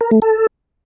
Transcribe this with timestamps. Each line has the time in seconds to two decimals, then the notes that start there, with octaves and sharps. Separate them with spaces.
0.01 A#4
0.11 A3
0.22 A4